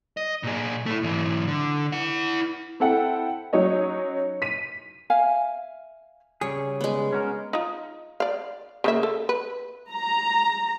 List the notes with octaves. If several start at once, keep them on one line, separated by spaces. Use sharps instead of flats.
D#5
A#2 G#4
A3 E4
G#2 E3
D3
E4 F#5
C4 E4 A4 F#5 G5
F#3 C#4 D#4 C#5 D#5
B6 D#7
E5 F5 G#5
C#3 G3 G#4 C#5
G#3 B3
C#4 F#4 A#4
D#4 F4
D5 F5
C#3 A#3 E5
A4
B4
A#5